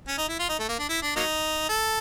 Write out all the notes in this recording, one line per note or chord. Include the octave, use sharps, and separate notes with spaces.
C#4
D#4
E4
F4
D#4
A3
A#3
D4
E4
D4
F#3 A#3 D#4
A4